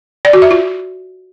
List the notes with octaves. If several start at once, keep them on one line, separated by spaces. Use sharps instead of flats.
D5
F#4
E5
F4